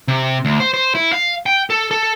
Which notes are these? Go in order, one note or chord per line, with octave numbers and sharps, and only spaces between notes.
C3
D2
C5
C5
E4
F5
G5
A4
A4